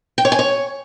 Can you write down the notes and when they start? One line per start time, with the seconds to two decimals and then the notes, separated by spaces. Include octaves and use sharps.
0.18 G5
0.25 C#5
0.32 G#5
0.39 C#5